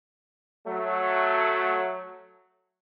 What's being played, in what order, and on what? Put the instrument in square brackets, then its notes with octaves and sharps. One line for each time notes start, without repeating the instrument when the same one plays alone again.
[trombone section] F#3 A3